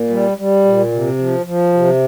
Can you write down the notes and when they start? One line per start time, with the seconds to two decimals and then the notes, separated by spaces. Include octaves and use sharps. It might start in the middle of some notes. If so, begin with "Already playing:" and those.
Already playing: A#2
0.10 G3
0.37 G3
0.65 A#2
0.92 C3
1.18 F3
1.46 F3
1.74 C3